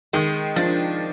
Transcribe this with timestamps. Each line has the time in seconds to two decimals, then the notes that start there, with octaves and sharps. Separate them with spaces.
0.13 D#3 G#3
0.56 F3 D4